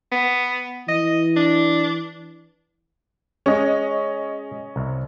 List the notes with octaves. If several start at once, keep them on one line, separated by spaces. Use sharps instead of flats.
B3
E3 D#5
D4
G#3 C#4 C#5 D#5
C2